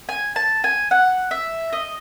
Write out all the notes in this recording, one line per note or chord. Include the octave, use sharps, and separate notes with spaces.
G#5
A5
G#5
F#5
E5
D#5